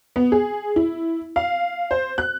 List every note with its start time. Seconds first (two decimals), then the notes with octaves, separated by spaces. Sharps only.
0.16 B3
0.32 G#4
0.76 E4
1.36 F5
1.91 C5
2.18 F#6